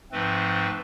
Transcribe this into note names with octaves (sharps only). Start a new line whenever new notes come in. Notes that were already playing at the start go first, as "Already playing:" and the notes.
G#2 F3 A3 C4 B4